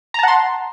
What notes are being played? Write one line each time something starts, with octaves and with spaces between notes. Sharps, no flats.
F#5 A5 A#5 C6